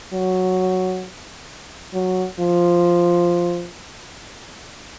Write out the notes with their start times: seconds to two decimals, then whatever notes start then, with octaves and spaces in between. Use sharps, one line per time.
0.13 F#3
1.94 F#3
2.40 F3